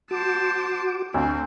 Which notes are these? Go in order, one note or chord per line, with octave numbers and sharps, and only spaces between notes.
F#4 C5 A5 D6
D2 C4